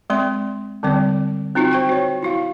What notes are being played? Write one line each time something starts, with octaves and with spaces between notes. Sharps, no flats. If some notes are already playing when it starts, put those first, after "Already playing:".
G#3 C4 D5 C6
D3 G3 C4 D5
C4 D#4 F4 F#4
C5 G5 C#6
F#4 C#5
E4 F#4 F5